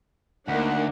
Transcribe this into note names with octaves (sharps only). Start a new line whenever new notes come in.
D2 A#3 D4 D#4 F#5